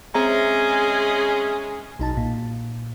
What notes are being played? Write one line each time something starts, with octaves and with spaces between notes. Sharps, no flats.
G#3 C4 C#4 G#4 E5 A#5
B1 D#4 A5
A#2